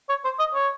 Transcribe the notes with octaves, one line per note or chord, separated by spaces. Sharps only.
C#5
C5
D#5
C#5